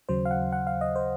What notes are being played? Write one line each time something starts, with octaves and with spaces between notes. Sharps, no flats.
D#2 C#3 F#3 C5
F5
F#5
F#5
F5
D#5
C5